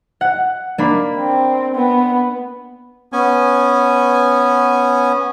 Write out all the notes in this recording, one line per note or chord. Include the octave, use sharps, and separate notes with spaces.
F#5
A#3 D4 B5
C4
B3
B3 C#4 G#5